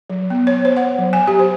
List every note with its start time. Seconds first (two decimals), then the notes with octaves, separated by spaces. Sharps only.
0.10 F#3
0.30 B3
0.47 C#5
0.65 C5
0.77 F#5
0.99 F#3
1.13 G#5
1.27 G4
1.39 C5